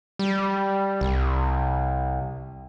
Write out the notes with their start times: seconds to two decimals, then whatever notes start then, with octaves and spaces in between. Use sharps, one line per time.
0.19 G3
1.01 C2